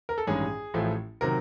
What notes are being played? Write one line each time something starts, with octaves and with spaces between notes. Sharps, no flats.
A#4
A4
A1 G2 D#3 G#3 C#4 G#4
A1 A2 F3 A3
C3 D#3 F#3 A#4